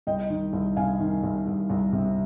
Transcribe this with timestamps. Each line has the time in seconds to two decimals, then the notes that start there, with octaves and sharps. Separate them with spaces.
0.07 C2 D#5 G5
0.30 D#3
0.53 C2
0.76 C3 F5 G#5
1.00 D#3
1.23 C2
1.47 C2
1.70 C2
1.93 C3